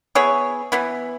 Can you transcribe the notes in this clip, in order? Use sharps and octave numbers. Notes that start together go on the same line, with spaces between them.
B3 E4 G#4 C#5
E3 B3 E4